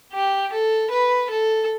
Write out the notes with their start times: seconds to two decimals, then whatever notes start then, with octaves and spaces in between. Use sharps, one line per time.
0.13 G4
0.52 A4
0.91 B4
1.31 A4